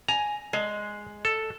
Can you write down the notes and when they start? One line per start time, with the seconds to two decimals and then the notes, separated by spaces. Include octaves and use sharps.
0.08 G#5 A#5
0.53 G#3
1.25 A4